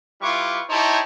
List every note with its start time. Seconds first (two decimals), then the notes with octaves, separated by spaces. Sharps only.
0.21 G3 E4 F4 B4 C#6 D6
0.70 D#4 E4 G4 C5 C#5 A5